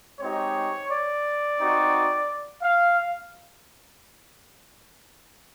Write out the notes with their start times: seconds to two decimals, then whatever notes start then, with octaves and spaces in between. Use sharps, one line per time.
0.19 G#3 C4 D#4 G4 C#5
0.89 D5
1.59 C4 D#4 F#4
2.62 F5